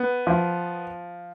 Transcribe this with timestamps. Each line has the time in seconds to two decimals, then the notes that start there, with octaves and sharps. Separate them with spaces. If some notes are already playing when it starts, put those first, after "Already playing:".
Already playing: B3
0.27 F3